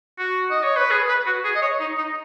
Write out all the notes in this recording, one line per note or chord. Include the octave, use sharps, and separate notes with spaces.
F#4
D#5
C#5
B4
G#4
B4
F#4
G#4
D#5
C#5
D#4
D#4